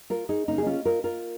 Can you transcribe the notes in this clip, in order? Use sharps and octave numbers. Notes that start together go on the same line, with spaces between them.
F4 A#4
D#4 G#4
C#3 A#3 C#4 D#4
G#4
C#4 F4
F4 A#4
F4 A#4